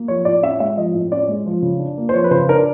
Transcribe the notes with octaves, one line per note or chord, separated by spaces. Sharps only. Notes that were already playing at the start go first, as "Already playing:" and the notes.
Already playing: A#3
F3 C#5
A2 D5
C#4 E5
G#3 E5
F3 D#5
A2
C#4 D5
G#3
F3
C#3
D4
A#3
C5
F3 C#5
B4
C#3 C5
D4 A#4